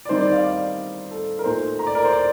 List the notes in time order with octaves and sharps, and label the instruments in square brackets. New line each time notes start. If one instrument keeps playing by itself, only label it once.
[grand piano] D5
D#3 G3 C4 D#4 C5
D5
F5
D5
A4
A#4
A#2 A3 D#4 C5
A#5
D5
A#4
C5
D5